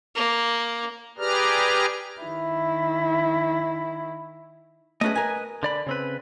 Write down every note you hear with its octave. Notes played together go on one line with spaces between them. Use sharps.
A#3
G4 G#4 B4 D5 A#5 F6
D#3 E4
A3 C#4 G#4 B4 D#5
A#4 G#5
D3 D5 B5
C#3 C4 B4